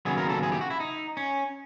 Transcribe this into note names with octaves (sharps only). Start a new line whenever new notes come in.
D#2 C#3 F#3 B3 G#4
A#4
A4
G#4
G4
F#4
E4
D#4
C#4